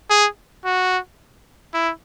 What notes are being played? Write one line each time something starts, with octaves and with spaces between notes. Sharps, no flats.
G#4
F#4
E4